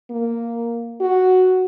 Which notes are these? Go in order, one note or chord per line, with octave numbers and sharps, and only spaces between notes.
A#3
F#4